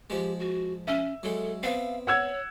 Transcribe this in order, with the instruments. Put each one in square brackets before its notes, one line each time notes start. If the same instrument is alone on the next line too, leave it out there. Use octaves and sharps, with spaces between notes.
[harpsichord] F3 G#3 [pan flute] G4
[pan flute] F#4
[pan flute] C#4 [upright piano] E5
[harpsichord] F#3 G#3 [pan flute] A4
[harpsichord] B3 C4 [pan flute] F5
[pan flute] C#5 [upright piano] F#5 E6 G#6